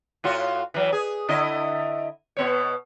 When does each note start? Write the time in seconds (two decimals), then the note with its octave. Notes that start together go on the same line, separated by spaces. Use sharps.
0.24 A2 F4 F#4
0.74 E3 F#3
0.93 G#4
1.29 D3 E4 D#5
2.37 B2 B3 C#5